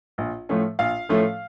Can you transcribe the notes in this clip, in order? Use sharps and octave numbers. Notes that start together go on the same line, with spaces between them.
A#1
A2 F3 A3 C#4
A#1 F5
A2 F3 A3 C#4